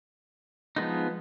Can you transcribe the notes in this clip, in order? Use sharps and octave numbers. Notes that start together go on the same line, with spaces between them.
F3 G#3 B3 D#4